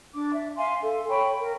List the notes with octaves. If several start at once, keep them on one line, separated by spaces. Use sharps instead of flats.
D4 D6
E5
E5 F5 G#5 C6
A4
C#5 G5 B5 C#6
A#4